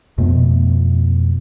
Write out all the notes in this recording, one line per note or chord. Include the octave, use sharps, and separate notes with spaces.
F2 B2 A3 B3